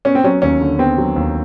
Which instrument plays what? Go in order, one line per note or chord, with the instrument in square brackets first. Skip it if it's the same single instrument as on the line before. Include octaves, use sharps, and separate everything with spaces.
[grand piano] B3 [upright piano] C#4
[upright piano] C4
[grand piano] F#3 [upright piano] C#4
[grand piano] D#2 [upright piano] C#4
[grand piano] D3
[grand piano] B3 [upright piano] C4
[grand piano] F#3
D#2